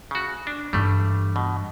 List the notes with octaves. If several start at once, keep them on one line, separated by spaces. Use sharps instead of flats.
C#3 F#4
D4
G2 E3 G3 A3
B2